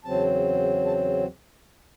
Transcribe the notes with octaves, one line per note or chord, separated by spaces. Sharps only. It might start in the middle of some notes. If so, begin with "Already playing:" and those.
E2 C#3 F#3 C4 A5
A5